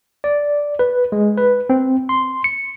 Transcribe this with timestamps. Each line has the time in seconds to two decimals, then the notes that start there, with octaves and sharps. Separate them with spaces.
0.24 D5
0.79 B4
1.12 G#3
1.38 B4
1.70 C4
2.09 C6
2.44 C#7